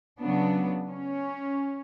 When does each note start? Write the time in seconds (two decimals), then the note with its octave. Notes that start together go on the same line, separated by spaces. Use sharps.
0.21 C#3 F#3 B3 D4
0.90 C#4